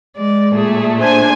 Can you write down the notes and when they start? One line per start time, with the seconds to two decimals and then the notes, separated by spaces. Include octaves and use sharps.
0.16 G#3 D5
0.54 A#2 A3 G#4
0.99 D4 C5 G#5